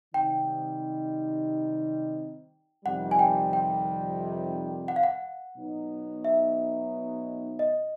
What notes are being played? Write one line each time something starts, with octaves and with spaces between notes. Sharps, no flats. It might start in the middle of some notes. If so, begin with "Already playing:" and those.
C3 D#3 G3 C4 D#4 G5
F2 C3 D#3 G3 F#5
G#5
G5
G5
F#5
F5
F#5
B2 F#3 B3 D#4
E5
D#5